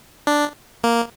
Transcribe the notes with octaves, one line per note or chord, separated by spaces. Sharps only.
D4
A#3